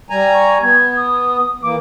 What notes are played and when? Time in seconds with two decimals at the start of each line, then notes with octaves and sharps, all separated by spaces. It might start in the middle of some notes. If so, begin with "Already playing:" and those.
0.10 G3 G#5 A#5
0.34 C#6
0.62 B3 G#6
0.97 D#6
1.63 E3 A#3 D6